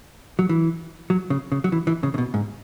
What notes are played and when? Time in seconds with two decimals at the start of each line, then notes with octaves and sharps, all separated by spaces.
0.39 F#3
0.49 E3
1.10 F#3
1.30 C#3
1.52 C#3
1.64 F#3
1.72 E3
1.87 E3
2.03 C#3
2.14 C#3
2.18 B2
2.34 G#2